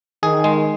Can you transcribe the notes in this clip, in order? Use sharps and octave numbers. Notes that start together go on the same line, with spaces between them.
D#3 G#4
G#3